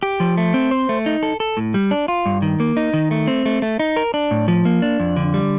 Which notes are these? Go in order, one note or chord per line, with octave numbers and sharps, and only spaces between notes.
G4
F3
A3
C4
C5
A3
D#4
A4
A4
A2
G3
D4
F4
G2
D#3
A#3
D#4
D#3
A3
C4
A3
A3
D#4
A#4
D4
A2
F3
A#3
D4
F2
D3
G3